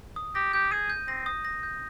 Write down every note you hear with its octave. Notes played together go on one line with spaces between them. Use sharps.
D#6
G4 A#6
G4 G6
G#4 D#7
G6
C4 A#6
D#6
A#6
G6